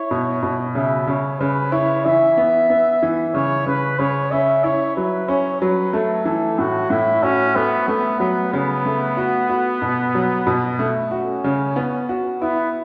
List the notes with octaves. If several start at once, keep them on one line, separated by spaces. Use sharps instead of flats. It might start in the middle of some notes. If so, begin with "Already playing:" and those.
Already playing: E4 C#5
B2
B2
C#3 E5
C#3 C#5
C#3 B4
E4 C#5
E3 E5
B3
B3
E3
C#3 C#5
C#3 B4
C#3 C#5
C#4 E5
E4 C#5
F#3 B4
C#4 C#5
F#3 B4
A3 A4
E3 A4
A2 F#4
A2 E4
C#4 F#4
A3 B3
A3 B3
F#3 B3
C#3 B3
A3
F#4
F#4
B2
F#3
B2
A3
C#4 F#4
C#3
B3
F#4
B3 E4